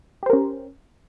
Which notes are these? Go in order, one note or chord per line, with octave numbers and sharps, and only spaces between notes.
C#4 G4 A#4 C5